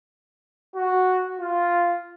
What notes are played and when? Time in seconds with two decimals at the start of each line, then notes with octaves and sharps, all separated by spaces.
0.75 F#4
1.39 F4